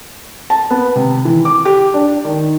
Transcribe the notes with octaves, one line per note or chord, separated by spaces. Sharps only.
A5
B3
C3
E3
D6
G4
D4
D#3